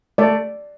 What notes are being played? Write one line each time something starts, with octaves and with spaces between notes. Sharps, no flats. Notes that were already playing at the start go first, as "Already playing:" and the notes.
A3 D5